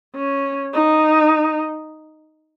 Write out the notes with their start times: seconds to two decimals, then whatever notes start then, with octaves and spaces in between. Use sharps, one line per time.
0.15 C#4
0.73 D#4